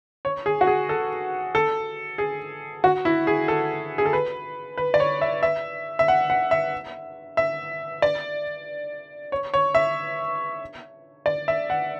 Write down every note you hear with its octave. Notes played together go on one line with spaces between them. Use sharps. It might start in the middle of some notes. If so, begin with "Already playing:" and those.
C#5
G#4
F#4
G#4
A4
A4
G#4
F#4
E4
G#4
A4
G#4
A4
B4
B4
D5
C#5
E5
E5
E5
F#5
F#5
E5
E5
D5
C#5
C#5
E5
D5
E5
F#5